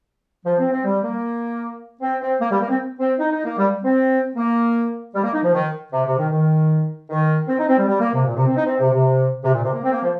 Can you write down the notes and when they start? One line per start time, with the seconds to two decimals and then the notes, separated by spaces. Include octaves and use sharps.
0.45 F3
0.59 C4
0.72 C4
0.84 G3
1.03 A#3
2.01 C4
2.21 C4
2.41 A#3
2.51 G3
2.61 A#3
2.69 C4
2.99 C4
3.19 D#4
3.32 D#4
3.45 A#3
3.58 G3
3.84 C4
4.36 A#3
5.15 G3
5.24 A#3
5.34 D#4
5.43 F3
5.53 D#3
5.92 C3
6.06 C3
6.18 D#3
6.31 D#3
7.10 D#3
7.48 C4
7.59 D#4
7.68 C4
7.78 G3
7.88 G3
8.00 A#3
8.13 C3
8.26 A#2
8.36 C3
8.47 C4
8.56 D#4
8.66 C4
8.79 C3
8.92 C3
9.44 C3
9.54 A#2
9.64 C3
9.73 A#3
9.83 C4
9.92 A#3
10.03 F3